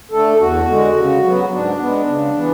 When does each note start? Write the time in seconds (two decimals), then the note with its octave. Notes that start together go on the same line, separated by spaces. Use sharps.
0.11 D3 A3 A4
0.39 E2 F#4
0.67 D3 G#3
0.96 C#3
1.23 F#3 B3
1.51 G#2 D4
1.79 G#3 B3
2.07 C#3
2.35 E3 B3